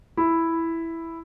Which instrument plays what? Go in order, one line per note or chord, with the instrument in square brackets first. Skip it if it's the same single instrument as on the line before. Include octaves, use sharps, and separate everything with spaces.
[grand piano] E4